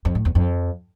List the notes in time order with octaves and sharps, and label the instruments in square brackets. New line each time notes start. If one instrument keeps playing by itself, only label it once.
[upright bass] F2
A2
E2
F2